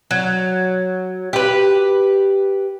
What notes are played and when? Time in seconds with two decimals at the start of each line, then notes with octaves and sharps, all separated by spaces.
0.11 F#3
1.33 G4 B4